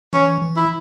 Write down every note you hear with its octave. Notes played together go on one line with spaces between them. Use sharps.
E3 C#4
E3
E4